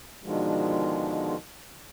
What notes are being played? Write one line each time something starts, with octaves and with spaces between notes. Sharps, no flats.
B2 D3 D#3 F3 G#3